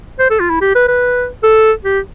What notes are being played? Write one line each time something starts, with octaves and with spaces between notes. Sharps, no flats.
C5
A4
F4
E4
G4
B4
B4
A4
G4